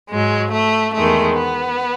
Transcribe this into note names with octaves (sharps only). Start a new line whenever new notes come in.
G#2 F#3 G#3
A3
E2 D#3 G#3 A3
B3